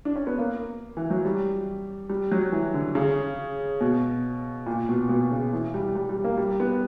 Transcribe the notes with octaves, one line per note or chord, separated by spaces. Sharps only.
D4
C#4
B3
A#3
E3
F#3
G3
G3
F#3
E3
D3
C#3
B2
A#2
B2
B2
C#3
E3
G3
G3
G3
A#3
G3
B3